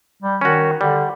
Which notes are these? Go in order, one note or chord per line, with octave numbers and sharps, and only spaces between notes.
G3
D#3 C#4 F#4
D3 G3